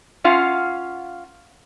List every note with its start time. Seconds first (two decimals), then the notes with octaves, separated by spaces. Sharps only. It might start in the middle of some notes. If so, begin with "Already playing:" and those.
0.24 C#4 F4 F5 F#5